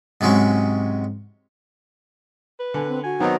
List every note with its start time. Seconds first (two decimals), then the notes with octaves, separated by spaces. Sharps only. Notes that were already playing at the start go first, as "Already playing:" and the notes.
0.21 G#2 C3 F#3 G#3 C#4
2.60 B4
2.74 D3 G#5
2.88 C4
3.03 F#4 G#5
3.20 D#3 F#3 B3 C4 D#4